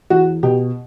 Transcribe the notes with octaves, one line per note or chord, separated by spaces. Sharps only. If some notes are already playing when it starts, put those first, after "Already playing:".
E2 F#4
B2 G4